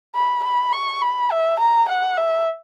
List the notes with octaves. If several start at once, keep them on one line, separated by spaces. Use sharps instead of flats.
B5
B5
C#6
B5
E5
A#5
F#5
E5